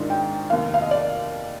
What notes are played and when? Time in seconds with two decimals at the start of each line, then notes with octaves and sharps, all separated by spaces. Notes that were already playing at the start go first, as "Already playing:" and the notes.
Already playing: G#2 D#3 G#3 D4 F4
0.10 G5
0.50 F1 D#2 D#3 F5
0.74 F5
0.82 D#5
0.91 D5